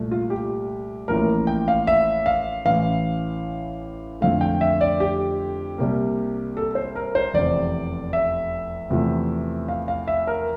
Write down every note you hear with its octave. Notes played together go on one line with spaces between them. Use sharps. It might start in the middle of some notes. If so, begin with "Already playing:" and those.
Already playing: C2 A#2 A3
F4
G4
A1 A2 F3 A#3 A#4
G5
F5
E5
F5
A1 A2 E3 F5
F2 D3 A3 F5
G5
E5
D5
G4
C2 C3 G3 A#3
A4
C5
A#4
C5
F1 E2 C3 D5
E5
E2 C3 F3 A3
F5
F5
E5
A#4